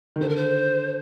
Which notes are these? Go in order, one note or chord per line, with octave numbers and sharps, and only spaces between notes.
D#3
D3 C5
A#4
C5